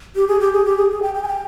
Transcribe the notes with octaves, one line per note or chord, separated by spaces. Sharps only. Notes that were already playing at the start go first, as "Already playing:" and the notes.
G4
G#4
G4
G#4
G4
G#4
G#4
G5
G5
G#5
G5